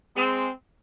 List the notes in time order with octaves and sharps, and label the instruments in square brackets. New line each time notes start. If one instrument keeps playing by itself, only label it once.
[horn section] G#3 C4